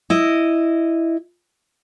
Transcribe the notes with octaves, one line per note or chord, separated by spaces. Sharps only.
E4 D#5